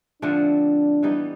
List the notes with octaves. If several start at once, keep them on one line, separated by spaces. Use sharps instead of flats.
D3 F3 A3 C4 D4
E3 G3 B3 D#4